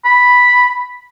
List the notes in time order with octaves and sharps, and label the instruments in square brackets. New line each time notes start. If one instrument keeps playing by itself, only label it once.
[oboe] B5